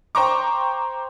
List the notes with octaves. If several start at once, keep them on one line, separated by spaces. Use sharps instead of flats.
C5 G5 A#5 C#6 D6